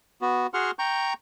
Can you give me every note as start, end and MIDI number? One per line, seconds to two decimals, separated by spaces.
0.21 0.47 59
0.21 0.47 66
0.54 0.71 66
0.54 0.71 68
0.54 0.71 78
0.54 0.71 84
0.54 0.71 85
0.54 0.71 89
0.79 1.13 79
0.79 1.13 82
0.79 1.13 85
0.79 1.13 91